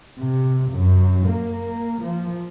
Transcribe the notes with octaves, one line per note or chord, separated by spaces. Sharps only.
C3
F#2
A#3
F3